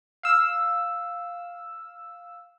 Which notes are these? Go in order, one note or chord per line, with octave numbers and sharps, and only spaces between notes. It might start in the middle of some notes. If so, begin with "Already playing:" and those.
F5 E6